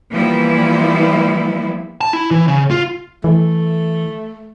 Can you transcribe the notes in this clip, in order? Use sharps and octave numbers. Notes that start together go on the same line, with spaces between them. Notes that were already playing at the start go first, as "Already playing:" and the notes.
E3 F3 G3 A#3 B3 E4
A5
E4
E3
C#3
F4
E3 A3